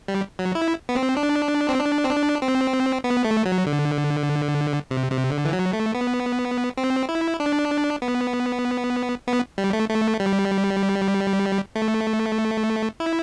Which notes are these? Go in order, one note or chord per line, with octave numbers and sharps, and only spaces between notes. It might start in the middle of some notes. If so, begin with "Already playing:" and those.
G3
F#3
E4
B3
C4
D4
C4
D4
C4
D4
C4
B3
A3
F#3
D3
C3
C3
D3
E3
F#3
A3
B3
C4
E4
D4
B3
B3
G3
A3
A3
G3
A3
E4